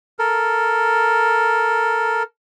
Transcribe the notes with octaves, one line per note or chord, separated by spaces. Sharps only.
A4 A#4